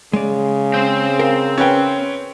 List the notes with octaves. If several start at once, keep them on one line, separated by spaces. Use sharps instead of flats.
C#3 G#3 D5
C4 C5
A#4 F5
C#4 B4 G5